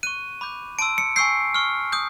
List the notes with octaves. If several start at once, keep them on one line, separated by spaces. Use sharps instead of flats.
C#6 F#6 D#7
B5 D6 G6
A5 C6 E6 D7
C#7
G#5 C#6 E6 G6 C7
C#6 F6
D#6 G6